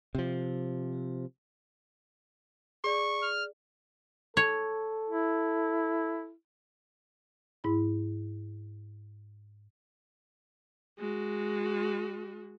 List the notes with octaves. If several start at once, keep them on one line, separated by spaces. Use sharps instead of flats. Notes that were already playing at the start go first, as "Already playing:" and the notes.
C3 F3
G#4 D5 C#6
F6
A4 C#5
E4
G#2 E4 B5
G#3 F#4